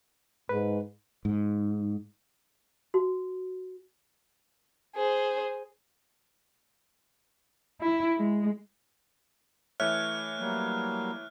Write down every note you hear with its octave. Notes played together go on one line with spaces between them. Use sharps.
G#2 B4
G#2
F#4
G#4 C5
E4
G#3
E3 A3 C#5 E5 F6 F#6
F#3 G3 A#3